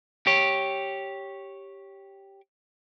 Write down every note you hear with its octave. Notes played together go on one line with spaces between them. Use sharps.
G4 C#5